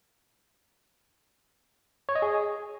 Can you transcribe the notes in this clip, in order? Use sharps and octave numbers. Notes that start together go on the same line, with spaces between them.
C#5
D#5
G#4